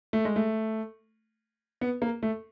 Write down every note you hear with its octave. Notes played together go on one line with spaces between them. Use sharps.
A3
G#3
A3
B3
A#3
A3